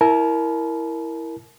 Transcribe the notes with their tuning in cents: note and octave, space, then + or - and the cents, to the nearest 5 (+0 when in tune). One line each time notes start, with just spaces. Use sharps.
E4 +0 A#4 +0 A5 -40